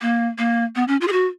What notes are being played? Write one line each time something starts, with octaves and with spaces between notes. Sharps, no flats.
A#3
A#3
B3
C#4
F4
G#4
F#4